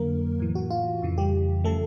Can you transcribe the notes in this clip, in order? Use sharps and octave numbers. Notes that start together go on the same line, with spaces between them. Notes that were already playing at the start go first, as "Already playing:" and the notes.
Already playing: F2 D3 F#3 A#3 A#4
A2 E3
F#4
F4
F2 C#3 E3
G3 G4
C#3 F3 A3 A4